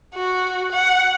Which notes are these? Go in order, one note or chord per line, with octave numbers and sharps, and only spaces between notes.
F#4
F#5